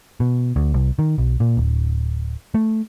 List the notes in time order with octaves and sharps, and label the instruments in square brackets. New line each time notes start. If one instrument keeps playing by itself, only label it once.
[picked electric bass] B2
D2
C2
D#3
B1
A#2
D1
A3